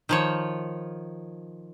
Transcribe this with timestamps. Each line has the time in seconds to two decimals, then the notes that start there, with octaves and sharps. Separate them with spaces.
0.09 D#3 F3 C#5